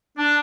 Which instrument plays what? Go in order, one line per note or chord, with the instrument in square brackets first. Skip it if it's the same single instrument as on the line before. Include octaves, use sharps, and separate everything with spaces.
[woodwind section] D4